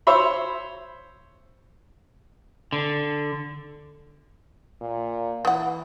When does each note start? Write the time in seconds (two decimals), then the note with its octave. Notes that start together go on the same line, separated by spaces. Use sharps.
0.07 C5 C#5 E5 B5
2.72 D3
4.81 A#2
5.45 E3 B3 F#5